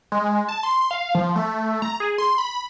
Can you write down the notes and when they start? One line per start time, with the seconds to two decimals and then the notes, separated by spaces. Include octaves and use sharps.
0.12 G#3
0.48 A5
0.63 C6
0.91 F5
1.15 F3
1.36 A3
1.82 A#5
2.00 G#4
2.18 C6
2.38 B5